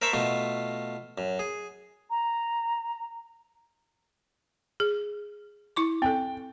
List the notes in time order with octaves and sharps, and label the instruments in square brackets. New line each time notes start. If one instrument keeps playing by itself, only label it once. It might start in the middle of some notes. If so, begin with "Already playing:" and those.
[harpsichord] A#4 C5 E5 A5 B5 C#6
B2 A3 F4
F#2
G#4
[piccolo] A#5
[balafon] G#4
E4 C#6 D6
[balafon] C4 A4 [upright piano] G5